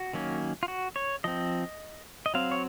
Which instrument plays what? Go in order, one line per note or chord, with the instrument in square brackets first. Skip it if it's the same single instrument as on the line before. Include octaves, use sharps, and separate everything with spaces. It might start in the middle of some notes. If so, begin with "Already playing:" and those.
Already playing: [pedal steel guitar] F#4
D#3 F#3 A#3 C#4
F4
F#4
C#5
F3 C4 D#5
D#5
F#3 C4 F5
C#5